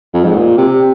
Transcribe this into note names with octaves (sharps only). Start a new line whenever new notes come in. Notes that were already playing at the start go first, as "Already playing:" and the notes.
F2
G#2
A#2
C3